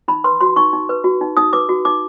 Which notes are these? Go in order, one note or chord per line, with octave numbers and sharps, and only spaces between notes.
D#4 B5
B4 C6
F#4 C6
D#4 C#6
D#4
B4
F#4
D#4
D#4 D#6
B4 D6
F#4
D#4 D6